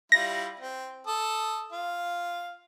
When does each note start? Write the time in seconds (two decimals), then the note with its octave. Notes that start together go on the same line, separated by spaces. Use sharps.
0.12 G3 E4 F4 A#6
0.60 C4
1.07 A4 D#6
1.72 F4 F5